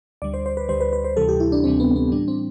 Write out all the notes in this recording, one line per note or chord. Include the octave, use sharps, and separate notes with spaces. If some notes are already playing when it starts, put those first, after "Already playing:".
D2 D3 G3 D5
C5
C5
B4
D2 D3 G3 C5
B4
B4
C5
D2 C3 E3 G3 A4
G4
E4
D4
D2 C3 E3 G3 C4
B3
B3
A2 E3 G3 D4
C4